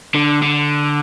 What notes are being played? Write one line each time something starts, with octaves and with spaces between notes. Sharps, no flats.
D3
D3